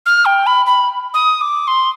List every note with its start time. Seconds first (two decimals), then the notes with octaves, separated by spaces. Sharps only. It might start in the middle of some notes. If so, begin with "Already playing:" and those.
0.06 F6
0.25 G5
0.47 B5
0.66 B5
1.14 D#6
1.41 D6
1.67 C6